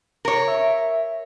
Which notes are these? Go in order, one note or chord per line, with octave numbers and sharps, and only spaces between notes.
A#4 C#5
E5